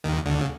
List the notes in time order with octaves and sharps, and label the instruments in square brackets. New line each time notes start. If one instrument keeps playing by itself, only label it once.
[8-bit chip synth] D#2 D#3
D2 D3
C#3